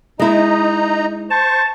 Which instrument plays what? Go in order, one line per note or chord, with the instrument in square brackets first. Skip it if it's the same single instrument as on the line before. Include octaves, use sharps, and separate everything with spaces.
[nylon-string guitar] G#3 E4 [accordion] D#4 D#5 A#5
[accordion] C5 C#6 [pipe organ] A5